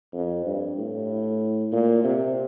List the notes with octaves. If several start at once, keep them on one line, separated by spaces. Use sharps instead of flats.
F2
G2
A2
A#2
C3